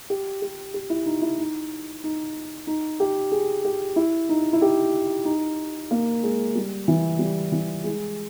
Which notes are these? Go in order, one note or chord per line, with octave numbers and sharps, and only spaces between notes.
G4
G4
G4
E4
D#4
E4
D#4
D#4
D#4
G4
G#4
G4
E4
D#4
E4
G4
D#4
A#3
G#3
G3
E3
G3
E3
G#3